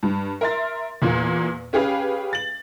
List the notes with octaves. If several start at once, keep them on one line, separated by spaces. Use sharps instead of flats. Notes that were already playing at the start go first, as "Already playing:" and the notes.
G2
A#4 E5 C6 A6
E2 A#2 A#3
C#4 G4 G#4 B4 F5
A6 F#7